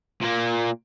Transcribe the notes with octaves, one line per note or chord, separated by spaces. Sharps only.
A#2 A#3